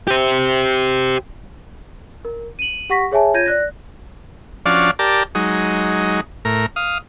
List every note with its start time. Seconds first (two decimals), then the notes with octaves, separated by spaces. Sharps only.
0.08 G4 C5
2.25 A#4
2.59 D#7 F#7
2.90 G4 F#5 C#6 A#6 B6
3.12 G#4 C#5 E5 G#5 A5
3.34 F4 C#5 G6 G#6 A#6 D#7
3.46 D5 F#6 A#6
4.66 F3 C#4 D4 F#4 D5 F5
4.99 G4 A#4 D5 A5
5.35 F#3 G#3 D#4
6.45 A2 A#4
6.76 F5 D#6